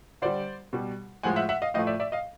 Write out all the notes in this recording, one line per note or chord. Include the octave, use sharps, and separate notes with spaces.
D3 G3 C5 D5
B2 G3
A2 F3 G#3 F#5 G#5
E5 F#5
E5 F#5
D#5 F5
A2 F3 A3 D#5 F5
D5 E5
D5 E5
D#5 F5